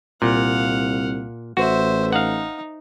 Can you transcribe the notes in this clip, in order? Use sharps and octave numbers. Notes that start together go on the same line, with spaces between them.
C2 A#2 F5 F#5
A1 F#4 C5 E5
D#4 F5 F#5